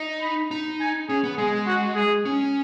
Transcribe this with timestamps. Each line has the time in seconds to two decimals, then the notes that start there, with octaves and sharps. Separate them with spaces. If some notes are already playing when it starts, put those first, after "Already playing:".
Already playing: D#4
0.22 B5
0.51 D#4
0.81 G#5
1.09 C#4 G#4
1.24 B3
1.38 G#3 G#4
1.66 F#4
1.95 G#4
2.25 C#4